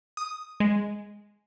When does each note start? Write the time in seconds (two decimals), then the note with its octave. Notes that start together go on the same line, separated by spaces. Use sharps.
0.17 D#6
0.60 G#3